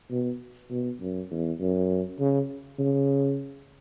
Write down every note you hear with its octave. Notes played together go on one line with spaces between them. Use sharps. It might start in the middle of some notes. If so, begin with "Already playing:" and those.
B2
B2
F#2
E2
F#2
C#3
C#3